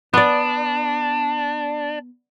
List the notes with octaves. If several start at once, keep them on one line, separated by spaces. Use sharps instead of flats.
B3 D4 D5